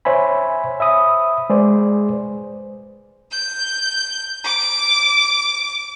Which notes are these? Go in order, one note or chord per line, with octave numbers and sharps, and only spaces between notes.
C5 C#5 E5 G#5 B5
E5 B5 D#6
G#3 G#4 B4 C5 D5
G6
D6